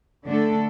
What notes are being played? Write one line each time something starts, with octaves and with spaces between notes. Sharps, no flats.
D3 A3 D4 A4